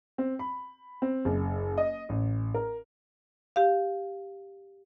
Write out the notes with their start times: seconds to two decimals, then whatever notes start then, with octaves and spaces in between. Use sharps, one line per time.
0.18 C4
0.39 B5
1.02 C4
1.25 F#1
1.78 D#5
2.09 A1
2.54 A#4
3.56 G4 F5